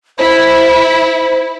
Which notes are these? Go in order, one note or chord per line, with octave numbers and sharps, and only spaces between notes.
E4 C5